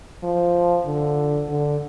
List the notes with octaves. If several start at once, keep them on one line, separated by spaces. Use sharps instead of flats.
F3
D3
D3